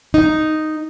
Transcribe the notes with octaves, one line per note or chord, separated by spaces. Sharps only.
D#4